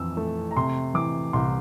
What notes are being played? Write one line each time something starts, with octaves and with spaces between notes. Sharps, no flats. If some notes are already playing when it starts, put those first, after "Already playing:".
Already playing: F2 E3 E6
A3
A#5
C3 C6
E3 D6
C2 C6